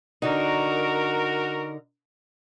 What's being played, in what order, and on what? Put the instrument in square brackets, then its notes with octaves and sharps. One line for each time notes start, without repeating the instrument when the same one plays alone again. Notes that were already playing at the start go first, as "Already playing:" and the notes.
[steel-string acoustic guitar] D3 D#4 [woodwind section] F#4 A#4